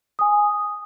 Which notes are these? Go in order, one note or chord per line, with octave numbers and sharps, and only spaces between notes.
G#5 D#6